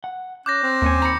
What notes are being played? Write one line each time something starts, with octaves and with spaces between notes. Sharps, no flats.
F#5
C#4 D6 F#6 G6 A#6
C4
D#2 A#3 C#4 G#5
D#3 A#5 B5 A#6 C#7